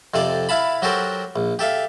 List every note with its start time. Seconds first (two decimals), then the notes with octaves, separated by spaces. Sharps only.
0.14 F2 C3 A4 D5 D6
0.49 E4 F5 A5 B5
0.82 F#3 F#4 G4 A4 A#4 C5
1.36 A#1
1.59 G4 A4 E5 F5